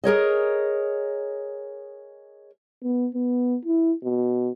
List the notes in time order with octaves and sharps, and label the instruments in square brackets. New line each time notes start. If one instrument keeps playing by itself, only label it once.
[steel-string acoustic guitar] G#4 A#4 C#5 D#5
[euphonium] B3
B3
E4
B2